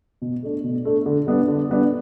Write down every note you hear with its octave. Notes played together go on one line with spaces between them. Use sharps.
B2
A3 D4
B2
A3 D4
D3
G3 B3 D4
D3
G3 B3 D4